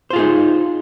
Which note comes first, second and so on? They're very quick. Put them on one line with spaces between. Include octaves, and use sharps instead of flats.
C5 F4 G#4 D#4